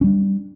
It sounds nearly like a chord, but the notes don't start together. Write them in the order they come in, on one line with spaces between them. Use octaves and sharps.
C#4 G3 D4